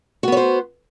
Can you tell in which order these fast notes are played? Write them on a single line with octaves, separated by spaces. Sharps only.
F#4 B3 C#5 C5